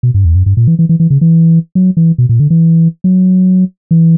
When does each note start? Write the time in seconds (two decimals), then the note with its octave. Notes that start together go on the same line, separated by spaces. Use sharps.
0.03 B2
0.14 G2
0.25 E2
0.35 F#2
0.46 G2
0.57 A#2
0.67 E3
0.79 E3
0.89 E3
1.00 E3
1.10 C#3
1.21 E3
1.75 F#3
1.97 E3
2.18 B2
2.29 A#2
2.40 D3
2.50 E3
3.04 F#3
3.91 E3